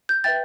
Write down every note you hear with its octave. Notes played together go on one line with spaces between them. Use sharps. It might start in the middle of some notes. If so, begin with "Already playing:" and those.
G6
B4 E5 G5 A6